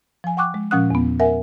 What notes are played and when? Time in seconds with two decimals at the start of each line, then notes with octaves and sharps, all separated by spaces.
0.24 F3 G#5
0.37 F#5 G5 C#6 D6 F#6
0.54 G#3
0.71 A#2 F3 C#4 F#5 D#6 F#6
0.90 E2 B3
1.20 A#4 E5 F#5 G#5